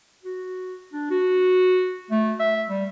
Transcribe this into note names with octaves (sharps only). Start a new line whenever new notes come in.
F#4
D4
F#4
A3
E5
G3